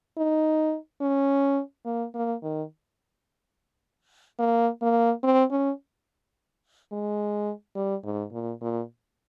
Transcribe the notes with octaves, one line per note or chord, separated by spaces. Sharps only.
D#4
C#4
A#3
A#3
D#3
A#3
A#3
C4
C#4
G#3
G3
G#2
A#2
A#2